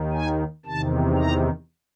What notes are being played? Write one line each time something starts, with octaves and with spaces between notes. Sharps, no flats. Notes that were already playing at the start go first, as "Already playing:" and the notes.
Already playing: D#2 D#3
G#5
E2 C3 D#3 A5
A#5